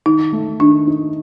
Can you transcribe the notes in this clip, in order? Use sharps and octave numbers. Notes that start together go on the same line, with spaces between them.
D#3 D#4
A3
D#3 D4
D#4